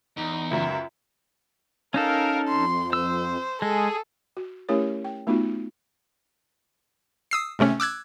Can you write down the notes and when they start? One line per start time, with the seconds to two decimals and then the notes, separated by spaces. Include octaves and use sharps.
0.17 E2 D#4
0.51 C#2 F#2 E5
1.94 C#4 D#4 A4 A#4 F5
2.48 F2 C6
2.93 C5 E6
3.62 G#3 G#4 A4
4.37 F#4
4.69 A3 C#4 E4 G4 A#4 C#5
5.04 G5
5.27 A3 B3 D#4 F4 F#4
7.31 D#6 E6 C7
7.59 G#1 C3 A3 C#4
7.80 D6 E6 F#6 G#6